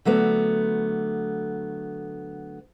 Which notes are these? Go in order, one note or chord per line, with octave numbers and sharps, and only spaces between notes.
D3 F#3 A3 B3